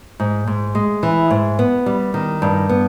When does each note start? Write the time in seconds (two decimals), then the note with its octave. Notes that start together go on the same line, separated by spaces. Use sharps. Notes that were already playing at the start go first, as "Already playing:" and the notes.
0.20 G#2
0.47 G#2
0.75 G#3
1.03 E3
1.31 G#2
1.59 B3
1.86 G3
2.14 D#3
2.42 G2
2.69 B3